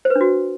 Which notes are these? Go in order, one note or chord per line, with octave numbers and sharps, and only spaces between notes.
C5
B4
D4
F#4